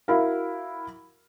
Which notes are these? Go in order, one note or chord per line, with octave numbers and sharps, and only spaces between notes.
E4 F#4 A#4 F5